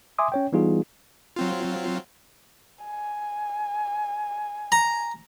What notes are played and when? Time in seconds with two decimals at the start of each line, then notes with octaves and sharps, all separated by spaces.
0.19 E5 G#5 C6 D6 D#6
0.32 C#4 C#5 G5
0.53 E3 G3 B3 D#4 F4 G#4
1.36 F#3 C4 F4
2.85 G#5
4.72 A#5